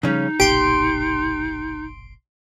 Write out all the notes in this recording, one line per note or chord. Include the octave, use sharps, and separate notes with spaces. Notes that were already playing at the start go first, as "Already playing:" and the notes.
C#3 F3 G3 C#4 D#4
F#1 B1 A#2 G4 C6 D7